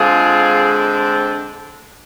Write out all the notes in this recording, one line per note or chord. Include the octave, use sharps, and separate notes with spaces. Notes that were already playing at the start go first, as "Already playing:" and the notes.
Already playing: D3 G#3 C4 F4 G#4